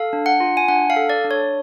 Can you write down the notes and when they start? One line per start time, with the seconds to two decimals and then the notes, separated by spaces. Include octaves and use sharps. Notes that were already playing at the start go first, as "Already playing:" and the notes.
Already playing: A4 F5
0.13 D4
0.26 F#5
0.40 F4
0.57 G#5
0.68 D4 F#5
0.90 F5
0.96 A4
1.10 D5
1.24 D4
1.31 C#5